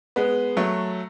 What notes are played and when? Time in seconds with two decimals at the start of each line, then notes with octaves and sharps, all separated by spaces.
0.16 G#3 B3
0.57 F#3 A3